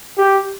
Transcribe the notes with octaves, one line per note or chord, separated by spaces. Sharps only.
G4